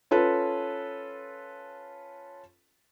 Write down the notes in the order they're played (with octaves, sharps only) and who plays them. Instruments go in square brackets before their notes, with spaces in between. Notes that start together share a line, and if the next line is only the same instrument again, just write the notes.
[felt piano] C#4 F4 A4 B4